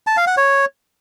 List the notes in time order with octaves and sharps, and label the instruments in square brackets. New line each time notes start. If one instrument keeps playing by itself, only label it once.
[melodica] A5
F5
F#5
C#5